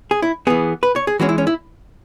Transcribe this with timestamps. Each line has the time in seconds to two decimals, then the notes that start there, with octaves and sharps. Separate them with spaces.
0.11 G#4
0.22 E4
0.47 E3 B3 G#4
0.83 B4
0.96 C#5
1.07 G#4
1.19 E3 G#3 C#4 F#4
1.29 E4
1.38 C#4
1.47 E4